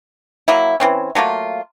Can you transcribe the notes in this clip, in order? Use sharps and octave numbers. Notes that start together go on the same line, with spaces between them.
F#3 A#3 E4
E3 C4 C#4
F#3 A3 A#3 F4